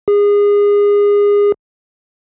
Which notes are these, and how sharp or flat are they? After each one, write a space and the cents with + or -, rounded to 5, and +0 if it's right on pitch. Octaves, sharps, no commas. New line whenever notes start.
G#4 -25